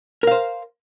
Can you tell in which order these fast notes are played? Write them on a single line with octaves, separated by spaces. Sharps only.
A#4 F5 C5